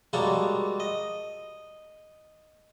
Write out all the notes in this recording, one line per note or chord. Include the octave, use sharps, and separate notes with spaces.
G3 G#3 A#3 F#4 A4 C#5
D#5